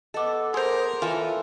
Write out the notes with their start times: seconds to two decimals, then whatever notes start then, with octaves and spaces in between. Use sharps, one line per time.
0.14 B3 A4 D#5 D6
0.54 G#4 A#4 C5 C6
1.02 E3 F4 A4 C#5